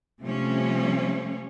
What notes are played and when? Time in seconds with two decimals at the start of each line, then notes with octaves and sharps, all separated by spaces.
0.22 C3 F3 G3 A3 C4 C#4